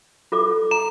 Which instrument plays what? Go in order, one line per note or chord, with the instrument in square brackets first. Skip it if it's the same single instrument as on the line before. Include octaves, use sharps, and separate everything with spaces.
[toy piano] F4 A4 D6
[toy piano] A#5 [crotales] E7